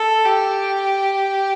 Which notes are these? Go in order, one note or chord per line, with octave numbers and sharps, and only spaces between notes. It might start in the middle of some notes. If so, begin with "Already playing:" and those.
Already playing: A4
G4